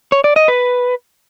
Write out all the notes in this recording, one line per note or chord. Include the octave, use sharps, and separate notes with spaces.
C#5
D5
D#5
B4